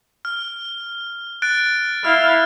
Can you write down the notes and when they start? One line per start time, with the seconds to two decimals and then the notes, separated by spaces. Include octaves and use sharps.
0.25 F6
1.42 F#6 A6 D7
2.05 E4 F5 F6